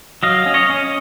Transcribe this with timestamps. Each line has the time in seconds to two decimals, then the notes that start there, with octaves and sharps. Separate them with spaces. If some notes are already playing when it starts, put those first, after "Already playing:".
0.23 F#3 D#5 F5
0.46 C#4
0.54 C#5 D#5
0.70 C#4